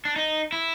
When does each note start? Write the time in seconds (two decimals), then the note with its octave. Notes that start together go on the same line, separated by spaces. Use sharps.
0.05 D4
0.16 D#4
0.52 E4